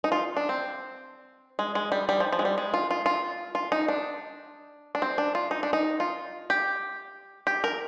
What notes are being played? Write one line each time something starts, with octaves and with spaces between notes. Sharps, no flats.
D#4
F4
D4
C4
G#3
G#3
G3
G3
F3
F3
G#3
G3
G#3
F4
F4
F4
F4
D#4
D4
D4
C4
D4
F4
D#4
D4
D#4
F4
G4
G4
A#4